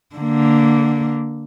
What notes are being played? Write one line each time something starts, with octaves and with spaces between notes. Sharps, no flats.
D3 A#3